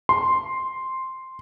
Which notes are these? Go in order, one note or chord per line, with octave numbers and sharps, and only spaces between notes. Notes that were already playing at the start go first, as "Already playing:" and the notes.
C6